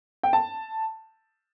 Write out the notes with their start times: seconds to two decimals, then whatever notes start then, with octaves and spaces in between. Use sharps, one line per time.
0.23 G5
0.33 A5